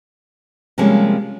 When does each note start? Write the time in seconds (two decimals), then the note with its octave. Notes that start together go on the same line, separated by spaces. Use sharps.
0.78 C3 F3 G3 G#3 A#3 C#4